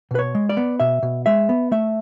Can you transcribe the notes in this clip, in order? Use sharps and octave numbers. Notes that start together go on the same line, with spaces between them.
B2 B4
C#5
G#3
D5
B3
B2 E5
B2
G#3 E5
B3
A3 E5